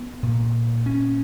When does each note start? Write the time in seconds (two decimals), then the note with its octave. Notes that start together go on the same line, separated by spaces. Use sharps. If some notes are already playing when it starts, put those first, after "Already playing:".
Already playing: B3
0.23 A#2
0.86 C#4